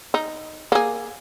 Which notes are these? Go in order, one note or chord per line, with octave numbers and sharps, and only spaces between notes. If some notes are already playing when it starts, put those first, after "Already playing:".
D#4
A#3 G#4